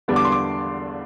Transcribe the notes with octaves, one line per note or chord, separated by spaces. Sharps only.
E2 D3 G3 B3 D4
D6
C6
D6